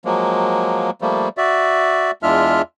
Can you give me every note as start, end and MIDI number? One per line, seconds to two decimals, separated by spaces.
0.05 0.90 53
0.05 0.90 54
0.05 0.90 56
0.05 0.90 58
1.02 1.28 53
1.02 1.28 55
1.02 1.28 57
1.02 1.28 58
1.37 2.11 66
1.37 2.11 74
1.37 2.11 76
2.23 2.62 40
2.23 2.62 56
2.23 2.62 62
2.23 2.62 65
2.23 2.62 76
2.23 2.62 89